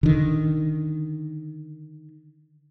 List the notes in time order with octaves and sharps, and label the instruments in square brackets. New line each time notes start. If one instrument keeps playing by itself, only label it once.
[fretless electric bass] D3 D#3